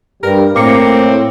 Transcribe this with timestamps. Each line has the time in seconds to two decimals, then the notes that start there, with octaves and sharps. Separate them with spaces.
0.23 G2 G3 A#4
0.56 A2 A#3 C4 D6 C#7